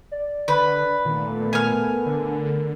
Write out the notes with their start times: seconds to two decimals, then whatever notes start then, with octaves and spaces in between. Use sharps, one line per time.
0.12 D5
0.48 D3 B4
1.05 A#2 D#3 A3 B3
1.53 A#4 G#5 F6
2.06 D3